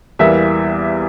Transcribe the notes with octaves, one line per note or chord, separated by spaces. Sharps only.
E2 E3 G3 A#3 E5